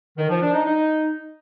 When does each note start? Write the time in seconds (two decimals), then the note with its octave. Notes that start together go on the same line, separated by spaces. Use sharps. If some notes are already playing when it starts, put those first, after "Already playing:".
0.18 D#3
0.29 F3
0.41 D4
0.53 D#4
0.65 D#4